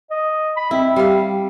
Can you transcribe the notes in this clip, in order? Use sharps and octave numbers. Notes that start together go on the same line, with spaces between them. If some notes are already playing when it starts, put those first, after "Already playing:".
D#5
B5
C4 E4
G3 F5